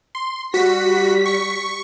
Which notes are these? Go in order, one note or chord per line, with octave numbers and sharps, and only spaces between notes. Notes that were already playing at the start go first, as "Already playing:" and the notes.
C6
G3 F#4 B6
C#6